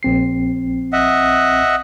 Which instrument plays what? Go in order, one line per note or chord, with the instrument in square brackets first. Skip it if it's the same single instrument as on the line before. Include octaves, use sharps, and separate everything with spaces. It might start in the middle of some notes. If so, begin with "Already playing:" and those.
[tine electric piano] A#1 C4 C7
[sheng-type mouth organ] D#5 E5 F#5